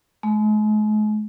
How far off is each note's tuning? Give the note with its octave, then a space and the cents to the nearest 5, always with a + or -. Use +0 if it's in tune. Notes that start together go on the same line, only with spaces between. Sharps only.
G#3 +45